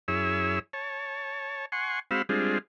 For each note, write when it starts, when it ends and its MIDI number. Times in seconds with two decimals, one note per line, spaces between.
0.08 0.59 42
0.08 0.59 64
0.08 0.59 68
0.08 0.59 73
0.08 0.59 88
0.73 1.66 73
0.73 1.66 81
1.72 1.99 78
1.72 1.99 80
1.72 1.99 84
1.72 1.99 85
2.11 2.22 56
2.11 2.22 60
2.11 2.22 66
2.11 2.22 77
2.11 2.22 83
2.11 2.22 88
2.29 2.58 55
2.29 2.58 56
2.29 2.58 60
2.29 2.58 62
2.29 2.58 65
2.29 2.58 68